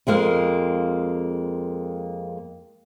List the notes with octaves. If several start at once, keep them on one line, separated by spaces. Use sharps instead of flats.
F2 G#3 A#3 F5